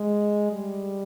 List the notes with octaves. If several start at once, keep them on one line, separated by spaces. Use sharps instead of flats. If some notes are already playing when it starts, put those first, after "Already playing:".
Already playing: G#3
G3